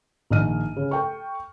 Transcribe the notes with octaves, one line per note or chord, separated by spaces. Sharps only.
A#1 D#3 D#5 F6 D#7
C#3
A4 G5 C#6